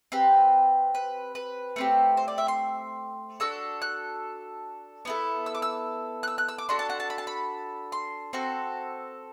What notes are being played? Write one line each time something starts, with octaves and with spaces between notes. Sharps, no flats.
C4 G4 B4
B4
B4
A3 C4 G4
C5
D5
E5
C6
D4 F#4 A4 E6
F#6
B3 E4 A4
E6
D6
E6
F#6
E6
F#6
E6
D6
D4 F#4 A4 C6
A5
F#5
A5
B5
A5
B5
C6
C4 F#4 A4